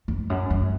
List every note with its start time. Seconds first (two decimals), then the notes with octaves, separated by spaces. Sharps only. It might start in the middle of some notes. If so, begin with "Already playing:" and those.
0.08 F2
0.30 F#2
0.50 F#2